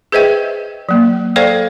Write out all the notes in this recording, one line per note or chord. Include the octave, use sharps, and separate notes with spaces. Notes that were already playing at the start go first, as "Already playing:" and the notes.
G#4 B4 C5 D#5 E5 G5
F#3 A#3
A4 C5 D5 F5 G5